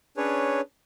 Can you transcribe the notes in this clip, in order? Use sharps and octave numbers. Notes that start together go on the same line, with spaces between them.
C#4 D4 G#4 B4 C#5